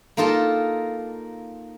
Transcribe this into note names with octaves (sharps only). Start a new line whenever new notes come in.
A#3 D#4 F4 A4 A5